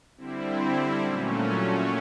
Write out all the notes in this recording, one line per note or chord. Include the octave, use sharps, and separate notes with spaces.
D3 G3 C4 E4
A#2 F#3 A3 C#4